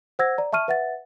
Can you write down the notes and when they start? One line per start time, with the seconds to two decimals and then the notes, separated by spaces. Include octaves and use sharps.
0.19 C5 F#5 E6 G#6 A#6
0.38 D5 A#5
0.53 E5 A5 C#6 F6 D#7
0.68 B4 E5 F#5 A6